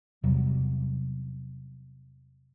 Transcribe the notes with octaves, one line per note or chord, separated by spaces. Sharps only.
E2 C3 F#3 G3